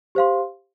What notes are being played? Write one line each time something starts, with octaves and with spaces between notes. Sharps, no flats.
G4 C5 F5 C6